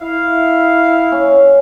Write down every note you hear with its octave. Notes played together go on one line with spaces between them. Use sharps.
E4 F5
C#4